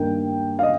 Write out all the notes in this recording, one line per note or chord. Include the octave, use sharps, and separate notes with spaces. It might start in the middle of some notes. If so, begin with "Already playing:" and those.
Already playing: G2 D#3 A#3 D#4 G5
F5
D#5